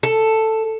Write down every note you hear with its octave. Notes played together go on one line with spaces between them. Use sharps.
A4